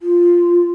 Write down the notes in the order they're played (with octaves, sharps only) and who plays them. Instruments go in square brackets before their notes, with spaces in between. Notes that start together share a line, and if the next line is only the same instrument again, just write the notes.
[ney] F4